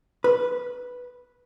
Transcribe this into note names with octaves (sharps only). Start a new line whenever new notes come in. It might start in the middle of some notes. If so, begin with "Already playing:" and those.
B4